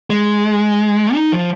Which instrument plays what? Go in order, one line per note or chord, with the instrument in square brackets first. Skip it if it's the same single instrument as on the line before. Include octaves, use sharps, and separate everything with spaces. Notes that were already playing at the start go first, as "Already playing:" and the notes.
[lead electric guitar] G#3
D#4
F3